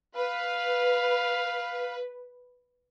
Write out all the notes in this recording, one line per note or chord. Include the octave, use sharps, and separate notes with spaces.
B4 F5